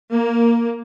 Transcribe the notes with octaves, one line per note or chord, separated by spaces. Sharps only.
A#3